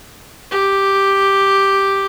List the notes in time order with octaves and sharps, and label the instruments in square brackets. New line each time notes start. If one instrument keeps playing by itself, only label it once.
[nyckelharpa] G4